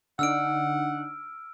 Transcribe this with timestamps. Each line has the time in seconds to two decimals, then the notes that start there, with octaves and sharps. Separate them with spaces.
0.19 D3 D4 D#4 F#5 E6 F6 D7